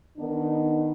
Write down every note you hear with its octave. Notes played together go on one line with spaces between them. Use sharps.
D#3 B3 D4 D#4